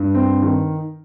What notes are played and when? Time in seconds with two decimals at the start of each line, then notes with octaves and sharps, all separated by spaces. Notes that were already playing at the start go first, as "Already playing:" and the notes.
Already playing: G2
0.14 C4
0.42 D#3